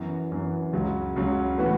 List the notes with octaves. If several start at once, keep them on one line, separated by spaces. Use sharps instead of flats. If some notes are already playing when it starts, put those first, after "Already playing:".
Already playing: F#2 E3 B3
F#2 E3 B3
C#2 C#3 F#3
C#2 C#3 F#3
A2 E3 B3 F#4